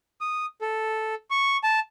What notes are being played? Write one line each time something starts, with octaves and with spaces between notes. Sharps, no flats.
D#6
A4
C#6
A5